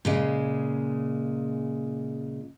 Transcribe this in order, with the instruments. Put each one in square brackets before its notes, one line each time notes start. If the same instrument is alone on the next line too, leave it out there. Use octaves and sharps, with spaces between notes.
[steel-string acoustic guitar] A#2 C#3 G#3